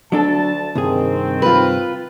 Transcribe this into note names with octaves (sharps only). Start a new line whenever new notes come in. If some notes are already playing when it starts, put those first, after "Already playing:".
D2 F#3 D4 A4 A5
C2 G2 D#3 C4 G#4
F4 B4